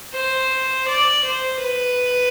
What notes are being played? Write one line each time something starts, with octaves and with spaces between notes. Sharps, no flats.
C5
D5
C5
B4